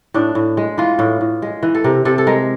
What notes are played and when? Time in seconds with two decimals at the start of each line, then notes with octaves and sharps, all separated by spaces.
0.14 A2 D4
0.35 A2
0.57 G#3
0.78 E3 F4
0.99 A2
1.21 A2
1.42 G#3
1.63 E3
1.75 A4
1.84 C3 A#4
2.05 C3 A4
2.18 A4
2.27 G#3 A#4